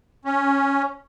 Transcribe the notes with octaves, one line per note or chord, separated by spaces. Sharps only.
C#4